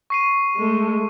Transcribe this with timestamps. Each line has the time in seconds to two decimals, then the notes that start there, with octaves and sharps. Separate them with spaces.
0.10 C#6 C7 D#7
0.56 G#3 A3